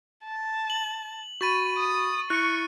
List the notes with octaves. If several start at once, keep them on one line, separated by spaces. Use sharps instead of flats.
A5
F#7
F#4 B5 C#6 A6 D#7
D#6
E4 C#6 F#6 C#7